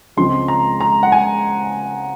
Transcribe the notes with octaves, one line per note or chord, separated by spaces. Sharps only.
C#2 C#3 F3 G#3 C4 C6
A#5
A#5
F#5
G#5